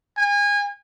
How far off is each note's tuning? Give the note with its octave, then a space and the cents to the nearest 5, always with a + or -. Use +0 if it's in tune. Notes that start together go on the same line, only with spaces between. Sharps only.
G#5 -30